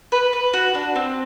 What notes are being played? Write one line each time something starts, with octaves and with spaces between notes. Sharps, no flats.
B4
B4
F#4
D4
C4